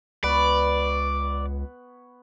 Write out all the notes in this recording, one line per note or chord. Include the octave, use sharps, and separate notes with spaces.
C#2 B3 B4 C#5 D5